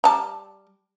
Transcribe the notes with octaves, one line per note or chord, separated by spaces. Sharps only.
G3 A5 A#5